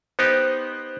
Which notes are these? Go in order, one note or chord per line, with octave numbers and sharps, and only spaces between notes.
B3 D#4 G4 C5 F#6